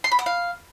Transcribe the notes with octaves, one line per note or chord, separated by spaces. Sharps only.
C6
B5
F#5
F5